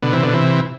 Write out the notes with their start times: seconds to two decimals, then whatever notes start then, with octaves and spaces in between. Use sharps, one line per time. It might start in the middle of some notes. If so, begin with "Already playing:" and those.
0.02 B2 D3
0.12 C3 E3
0.23 B2 D3
0.33 C3 E3